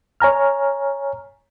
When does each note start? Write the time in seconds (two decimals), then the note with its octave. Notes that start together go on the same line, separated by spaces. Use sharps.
0.20 C#5 G#5 A#5 F6